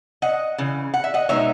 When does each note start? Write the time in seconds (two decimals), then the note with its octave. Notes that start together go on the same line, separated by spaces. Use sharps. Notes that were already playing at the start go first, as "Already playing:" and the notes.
0.22 D#5 F#5
0.58 C#3 E3
0.94 F#5
1.04 E5
1.14 D#5 F#5
1.29 B2 G#3 B3 D#4 C#5 E5